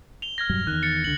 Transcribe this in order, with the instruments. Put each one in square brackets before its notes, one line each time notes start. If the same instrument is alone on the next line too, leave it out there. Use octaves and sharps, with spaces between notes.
[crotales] F7 G7
F6 G#6 A#6
[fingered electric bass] E1 G2 F#3
[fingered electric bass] E2 D#3 [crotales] F#6
[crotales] A6 C#7
[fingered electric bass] C#2 D3 [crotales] F#7